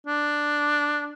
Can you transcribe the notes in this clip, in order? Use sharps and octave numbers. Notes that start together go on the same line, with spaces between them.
D4